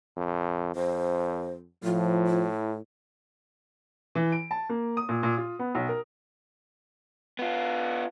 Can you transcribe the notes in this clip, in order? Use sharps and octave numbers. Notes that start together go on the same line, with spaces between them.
F2
F2 C5
A2 F3 F4
E4
E3
D7
A5
A#3
D#6
A#2
A#2
F4
B3
B1
A#4
B3 F4